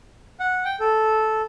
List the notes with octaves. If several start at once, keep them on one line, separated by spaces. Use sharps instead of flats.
F#5
G5
A4